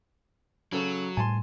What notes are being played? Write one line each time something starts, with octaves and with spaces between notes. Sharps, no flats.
C#3 F#3 A4 C#6
A2 G3 G#5 A5 C6